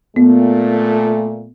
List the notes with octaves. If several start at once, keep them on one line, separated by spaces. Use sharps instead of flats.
A#2 A3 B3